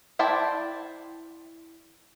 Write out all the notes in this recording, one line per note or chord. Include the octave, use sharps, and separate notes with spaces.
E4 C5 D5 G5 A5